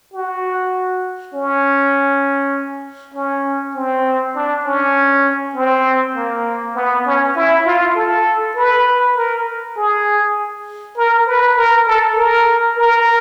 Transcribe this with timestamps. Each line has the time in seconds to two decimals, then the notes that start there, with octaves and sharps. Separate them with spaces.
0.14 F#4
1.34 C#4
3.14 C#4
3.75 C4
4.35 D4
4.65 C#4
5.55 C4
6.16 A#3
6.75 B3
7.06 C#4
7.36 E4
7.65 F4
7.96 A4
8.56 B4
9.16 A#4
9.76 G#4
10.97 A#4
11.27 B4
11.57 A#4
11.87 A4
12.17 A#4
12.77 A#4